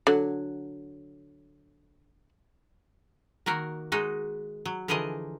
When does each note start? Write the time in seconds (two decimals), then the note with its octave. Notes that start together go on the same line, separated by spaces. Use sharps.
0.07 D3 F#3
3.46 D#3 A#3 F#4 A#4
3.92 G#3 D#4 F#4
4.65 F#3
4.88 D3 E3 F3 G#4 A#4 D#5